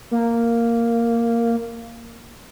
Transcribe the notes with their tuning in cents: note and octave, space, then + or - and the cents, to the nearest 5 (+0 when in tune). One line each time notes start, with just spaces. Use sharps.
A#3 -5